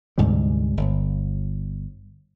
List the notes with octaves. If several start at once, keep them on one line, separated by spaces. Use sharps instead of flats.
D2 G#2 C3 G3
G1